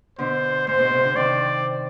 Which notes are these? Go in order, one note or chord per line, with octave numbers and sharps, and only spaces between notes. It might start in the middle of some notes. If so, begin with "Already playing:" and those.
B2 D3 C5
G#2 C5
B2
C3
D3
C3 D#3 D5